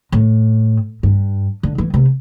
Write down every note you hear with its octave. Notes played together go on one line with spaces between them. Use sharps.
A2
G2
D3
E3
C3